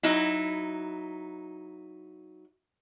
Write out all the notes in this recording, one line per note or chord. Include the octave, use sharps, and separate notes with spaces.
F#3 D#4 E4